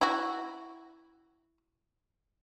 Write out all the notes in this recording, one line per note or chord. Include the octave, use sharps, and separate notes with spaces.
E4 F#4